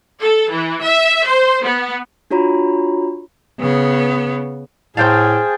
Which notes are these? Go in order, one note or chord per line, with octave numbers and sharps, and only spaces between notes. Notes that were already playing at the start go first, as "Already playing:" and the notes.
A4
E3
E5
C5
B3
D4 F4 F#4 C#5 A#5 B5
C#3 B3
A2 G#4 C5 F5 G5 A5